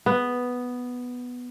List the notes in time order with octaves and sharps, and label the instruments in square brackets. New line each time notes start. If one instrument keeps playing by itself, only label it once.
[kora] B3